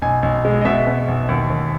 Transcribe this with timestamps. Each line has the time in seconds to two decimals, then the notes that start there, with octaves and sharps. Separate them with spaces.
0.02 B1 G#5
0.23 B1
0.45 G#3
0.61 D#5
0.65 B2 E5
0.87 B2
1.08 B1
1.28 D#2
1.50 D#2